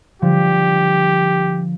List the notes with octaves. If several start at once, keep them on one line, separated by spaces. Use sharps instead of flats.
D3 F3 G3 G4